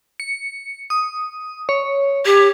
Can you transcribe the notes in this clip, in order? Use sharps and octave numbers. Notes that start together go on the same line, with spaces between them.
C#7
D#6
C#5
G4 G#6